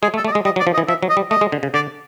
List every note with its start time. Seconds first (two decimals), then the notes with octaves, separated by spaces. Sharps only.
0.03 G#3 G#4
0.14 A3
0.17 A4
0.25 A3
0.27 D5
0.32 D#5
0.35 G#3
0.45 G3 D#5
0.56 F#3
0.60 D5
0.67 F3
0.74 D#5
0.78 E3
0.88 F3 E5
1.03 F#3
1.09 D#5
1.17 G3
1.30 A3 D#5
1.41 G#3
1.52 D3
1.63 C#3
1.74 D3 D5